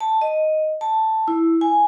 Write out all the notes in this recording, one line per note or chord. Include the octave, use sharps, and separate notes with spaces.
A5
D#5
A5
E4
G#5